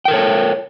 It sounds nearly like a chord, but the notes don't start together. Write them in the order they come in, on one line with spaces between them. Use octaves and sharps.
G5 A#4 A4 C#5